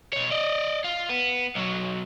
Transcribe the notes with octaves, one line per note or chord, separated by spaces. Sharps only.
B2 C#5
D5 D#5
F4
B3
B1 F#3